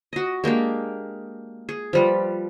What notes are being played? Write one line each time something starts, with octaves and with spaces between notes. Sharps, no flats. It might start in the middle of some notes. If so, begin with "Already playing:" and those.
F#4 D#5
G#3 A#3 D4 G4
G#4
F3 G3 B4